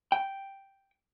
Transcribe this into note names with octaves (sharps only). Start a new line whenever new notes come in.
G5